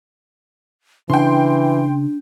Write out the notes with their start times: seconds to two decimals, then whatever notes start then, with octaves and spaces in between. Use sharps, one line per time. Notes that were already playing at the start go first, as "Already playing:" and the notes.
1.10 C#3 E3 D4 G5 C6